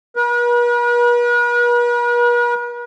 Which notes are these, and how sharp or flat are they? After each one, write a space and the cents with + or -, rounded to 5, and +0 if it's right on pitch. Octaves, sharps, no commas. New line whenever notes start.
B4 -45